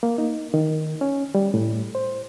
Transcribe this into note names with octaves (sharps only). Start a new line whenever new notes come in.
A#3
D#4
D#3
C#4
G3
A2
C5